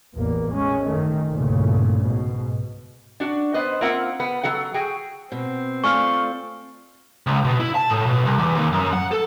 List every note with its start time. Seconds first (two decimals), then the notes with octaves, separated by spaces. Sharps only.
0.15 A1 E2 A#3
0.51 G#3 C#4
0.86 F#2 D#3 A3
1.31 C2 G2 A#2 C#3 A3
2.04 G#2 B2
3.20 D4 F#4
3.54 B3 B4 C5 D#5
3.81 A#3 C4 F4 A#4 E5 F#5
4.20 B3
4.43 F#3 A4 F#5
4.74 F#4 G#4 G5
5.32 B2 C4
5.84 A3 F4 D5 G#5 C#6 F6
7.27 C#2
7.45 B2
7.60 E4
7.75 A5
7.89 A2
8.06 B2
8.25 C2
8.38 E2
8.55 D#2
8.73 F#2
8.93 F#5
9.11 A4